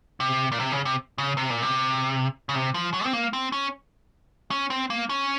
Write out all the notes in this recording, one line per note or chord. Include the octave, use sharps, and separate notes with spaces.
C3
A#2
C3
C#3
C3
C#3
C3
A#2
C3
C#3
C3
F3
F#3
C4
A#3
C4
C#4
C#4
C4
A#3
C#4